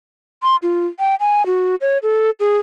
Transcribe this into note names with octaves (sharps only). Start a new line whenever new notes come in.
C6
F4
G5
G#5
F#4
C#5
A4
G#4